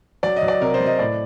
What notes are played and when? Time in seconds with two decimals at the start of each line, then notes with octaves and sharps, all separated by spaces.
0.23 F#3 D5
0.37 D#5
0.42 F#3
0.48 D5
0.61 C3 A#4
0.74 C5
0.81 F#3
0.86 D#5
0.99 A2 D5